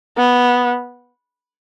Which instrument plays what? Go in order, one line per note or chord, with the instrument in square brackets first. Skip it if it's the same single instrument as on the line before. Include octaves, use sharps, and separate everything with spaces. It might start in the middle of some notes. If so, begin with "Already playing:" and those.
[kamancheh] B3